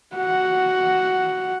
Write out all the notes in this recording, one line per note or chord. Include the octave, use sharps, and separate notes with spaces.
F#4 F#5